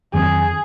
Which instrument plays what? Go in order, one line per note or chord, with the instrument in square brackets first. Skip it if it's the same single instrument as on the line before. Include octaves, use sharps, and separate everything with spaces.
[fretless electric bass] F2 D#3 F#3 C4 [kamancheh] G#4